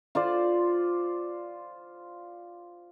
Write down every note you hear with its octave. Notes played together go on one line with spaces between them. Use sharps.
F4 C5 D5